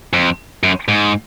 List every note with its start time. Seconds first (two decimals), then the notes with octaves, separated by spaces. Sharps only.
0.13 F2
0.63 F#2
0.88 G#2